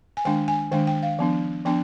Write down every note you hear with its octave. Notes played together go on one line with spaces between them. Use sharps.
G#5
D#3 G#3 D4 G5
G#5
D#3 G#3 D4 G5
G5
F5
F3 B3 D4
F3 B3 D4 G5